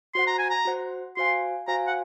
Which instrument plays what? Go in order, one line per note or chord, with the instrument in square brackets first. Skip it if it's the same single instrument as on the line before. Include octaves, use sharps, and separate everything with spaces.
[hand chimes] F#4 C5 F#5 [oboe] C6
[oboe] A#5
G#5
A#5
[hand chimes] F#4 C5 F#5
[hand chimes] F#4 C5 F5 G#5 [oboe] C6
[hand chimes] F#4 C5 F5 G#5 [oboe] A#5
[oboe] F#5